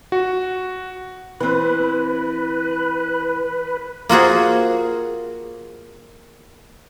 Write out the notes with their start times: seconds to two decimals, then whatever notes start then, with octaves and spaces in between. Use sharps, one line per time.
0.12 F#4
1.40 E3 C4 B4
4.09 A#3 F4 F#4 G#4